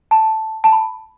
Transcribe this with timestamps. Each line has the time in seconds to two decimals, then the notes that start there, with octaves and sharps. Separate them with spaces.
0.11 A5
0.64 A5
0.72 B5